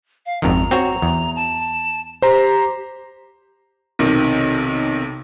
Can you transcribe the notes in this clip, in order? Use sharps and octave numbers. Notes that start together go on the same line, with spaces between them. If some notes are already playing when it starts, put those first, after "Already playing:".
F5
G#1 F2 D#3 A#5
C4 F#4 C#5
E2
A5
G4 C5 A#5
B1 C3 D#3